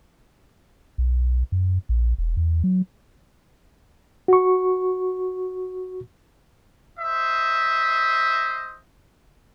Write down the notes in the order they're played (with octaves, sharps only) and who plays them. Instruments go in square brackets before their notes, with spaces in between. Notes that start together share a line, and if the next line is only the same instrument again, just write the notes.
[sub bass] B1
F#2
A#1
E1
E2
F#3
[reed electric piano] F#4 C#6
[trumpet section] C5 D#5 E5